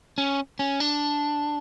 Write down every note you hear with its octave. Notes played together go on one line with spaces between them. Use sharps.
C#4
C#4
D4